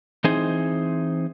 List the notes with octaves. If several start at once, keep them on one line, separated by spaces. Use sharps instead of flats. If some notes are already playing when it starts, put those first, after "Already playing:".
E3 C4 D#4 G#4 C5